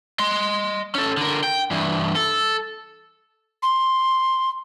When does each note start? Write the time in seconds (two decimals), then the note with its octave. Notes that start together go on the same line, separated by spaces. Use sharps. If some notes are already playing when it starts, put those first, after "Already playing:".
0.19 D#5 C6
0.95 C#4 A4
1.17 D3 A#4
1.44 G5
1.71 G2 E3
2.15 A4
3.63 C6